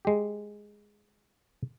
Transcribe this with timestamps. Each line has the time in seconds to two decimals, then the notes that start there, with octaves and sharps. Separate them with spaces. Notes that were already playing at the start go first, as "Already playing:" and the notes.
0.05 G#3 G4